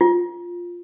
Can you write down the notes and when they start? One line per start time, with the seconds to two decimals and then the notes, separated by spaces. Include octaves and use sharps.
0.01 F4